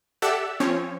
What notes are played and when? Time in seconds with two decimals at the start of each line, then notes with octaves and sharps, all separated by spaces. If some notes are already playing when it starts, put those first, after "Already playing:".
0.22 G4 A4 D5 E5 F#5 E6
0.60 F3 C4 C#4 C#5